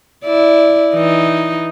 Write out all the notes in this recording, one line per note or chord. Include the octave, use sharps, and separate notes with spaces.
E4 D5
E3 D#4